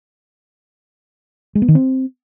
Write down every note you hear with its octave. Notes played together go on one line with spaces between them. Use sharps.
G#3
B3
D#3
C4